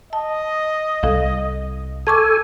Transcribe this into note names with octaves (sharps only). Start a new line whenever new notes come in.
D#5 A5
C2 G3 A4 F5
A4 G#5 A5 C#6 D6